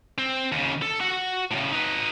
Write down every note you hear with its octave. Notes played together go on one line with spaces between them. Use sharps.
C4
D#2 C#3
A4
F#4 F#5
A2 C#3
D#4 B4